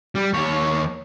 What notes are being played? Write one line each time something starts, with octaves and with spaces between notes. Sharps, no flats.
G3
D#2 C#5